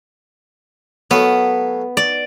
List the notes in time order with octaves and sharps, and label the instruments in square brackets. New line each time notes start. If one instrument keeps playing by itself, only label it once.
[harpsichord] F#3 A3 F5 [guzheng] B3
[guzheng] D5